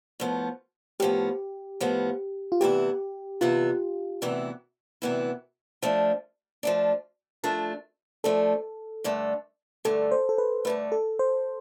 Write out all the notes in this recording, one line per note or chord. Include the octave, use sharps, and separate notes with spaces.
A2 F3 B3
A2 F3 B3 G4
A2 F3 B3
F4
D2 C3 E3 B3 E4 G4
D2 C3 E3 B3 E4 F4
D2 C3 E3 B3 E4
D2 C3 E3 B3 E4
F3 A3 D4
F3 A3 D4
F3 A3 D4
F3 A3 D4 A4
G2 D3 A3
G2 D3 A3 A4
C5
A4
B4
G2 D3 A3 B4
A4
C5